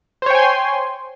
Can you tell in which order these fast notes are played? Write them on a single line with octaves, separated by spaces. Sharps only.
C5 C#5 G5 G#5 C6